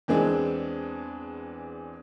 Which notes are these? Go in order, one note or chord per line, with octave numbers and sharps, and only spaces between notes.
E2 E3 G#3 C4 D4 G#4